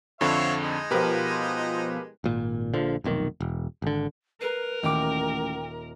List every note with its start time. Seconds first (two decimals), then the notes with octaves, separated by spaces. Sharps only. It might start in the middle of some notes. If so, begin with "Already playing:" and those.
0.21 F2 D3 C4 C#5 E5 F5
0.61 G#3 D#4
0.91 B2 F3 G4 A#4 B4
2.24 G#1 A#2
2.73 A#1 D3 F3
3.04 F1 B1 A#2 D#3
3.40 E1
3.82 G#1 D3
4.41 A#4 B4 C7
4.83 D#1 A1 G5 D6